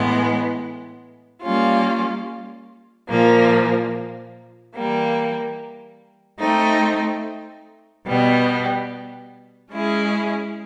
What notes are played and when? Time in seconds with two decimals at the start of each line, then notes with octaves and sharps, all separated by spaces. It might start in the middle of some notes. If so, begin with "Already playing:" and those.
Already playing: A2 E3 G#3 B3
1.42 G3 A#3 C#4 F4
3.08 A#2 F3 A#3
4.74 E3 G3 A#3
6.39 A3 C4 D#4
8.06 B2 G3 B3
9.71 G#3 C#4 E4 G#4